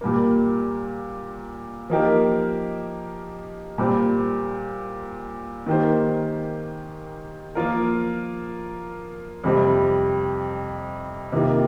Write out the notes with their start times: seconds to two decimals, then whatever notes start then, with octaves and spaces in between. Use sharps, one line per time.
0.01 A#2 G3 A#3
1.90 F3 A#3 D#4 G4 A#4
3.78 A#2 G3 C4
5.66 D#3 A#3 G4 C5
7.55 F3 A#3 F4 A#4
9.44 F2 C3 G3 C4
11.32 C3 D#3 A#3 F4